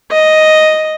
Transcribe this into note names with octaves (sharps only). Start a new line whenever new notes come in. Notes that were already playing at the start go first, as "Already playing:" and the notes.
D#5